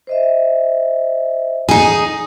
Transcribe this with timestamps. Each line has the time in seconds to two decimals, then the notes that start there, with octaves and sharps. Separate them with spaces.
0.07 C5 D#5 E5
1.69 D#4 G#4 D5 D#6